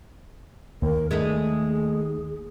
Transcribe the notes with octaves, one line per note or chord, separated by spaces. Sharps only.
D#2 A#4
G#3 A3 D#4 G#4